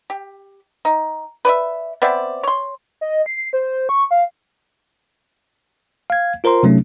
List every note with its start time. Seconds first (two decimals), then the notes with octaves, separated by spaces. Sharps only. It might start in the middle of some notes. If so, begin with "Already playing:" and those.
0.10 G4
0.85 D#4
1.45 B4 D5 E5
2.02 B3 C4 D5 E5
2.43 C#5 C6
3.01 D#5
3.26 C7
3.53 C5
3.89 C#6
4.11 F5
6.10 F5 G#6
6.44 F4 A#4 C5 A#5 C6
6.63 C3 F#3 A3 C#4 D#4